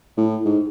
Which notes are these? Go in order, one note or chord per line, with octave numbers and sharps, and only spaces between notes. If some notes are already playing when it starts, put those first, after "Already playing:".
A2
G#2